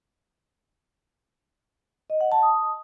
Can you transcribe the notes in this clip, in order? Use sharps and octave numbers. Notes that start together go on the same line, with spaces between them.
D#5
F#5
A5
D#6